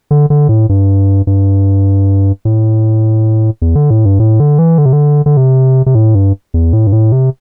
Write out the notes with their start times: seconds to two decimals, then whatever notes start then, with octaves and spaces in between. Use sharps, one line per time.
0.11 D3
0.30 D3
0.49 A2
0.69 G2
1.27 G2
2.45 A2
3.62 E2
3.76 D3
3.90 A2
4.05 G2
4.20 A2
4.40 D3
4.59 E3
4.78 D3
4.86 C3
4.93 D3
5.26 D3
5.37 C3
5.86 C3
5.95 A2
6.15 G2
6.54 E2
6.73 A2
6.87 G2
6.93 A2
7.12 C3